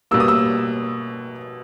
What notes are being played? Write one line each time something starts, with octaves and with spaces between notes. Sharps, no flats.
B2 G3 A#3 E6
D#6
E6